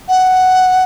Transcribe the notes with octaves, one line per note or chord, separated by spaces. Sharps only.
F#5